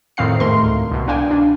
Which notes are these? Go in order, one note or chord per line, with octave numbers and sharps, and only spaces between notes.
F2 A2 D#3 C4 F5 C7
G#2 A3 A#4 C6
D2
C2 B2
D4 F5 G5 G#5
D4